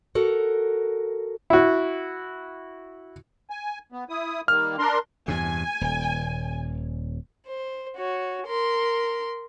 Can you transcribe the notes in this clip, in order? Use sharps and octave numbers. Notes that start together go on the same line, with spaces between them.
F#4 A4 A#4
E4 F#4
G#5
B3
E4 D#6
D#3 G3 A#3 F6
D4 A#4 C6
E2 G2 C3 G#5
D#1
C5
F#4 C#5
A#4 C6